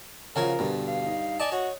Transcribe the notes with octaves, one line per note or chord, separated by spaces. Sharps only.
C#3 F3 C#4 F4 F#4 A#4 G#5
G2 B2 D3
F5
D#4
D5 D#5 G#5 A5
F#4 C#5